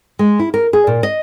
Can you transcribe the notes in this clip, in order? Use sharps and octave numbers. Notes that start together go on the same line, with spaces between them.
G#3
E4
A#4
G#4
A#2
D#5